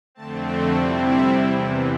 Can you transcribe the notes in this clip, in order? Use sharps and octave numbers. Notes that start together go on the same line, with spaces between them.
F2 D3 A3 C4 A5
D5
C3 G3 C4 E4 D5
E5
E2 C3 E3